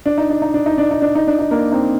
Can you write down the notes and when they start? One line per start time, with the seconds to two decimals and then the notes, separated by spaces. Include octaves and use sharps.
0.06 D4
0.18 D#4
0.30 D4
0.42 D#4
0.54 D4
0.66 D#4
0.78 D4
0.91 D#4
1.02 D4
1.15 D#4
1.27 D4
1.39 D#4
1.51 A#3 D4
1.72 C4 D#4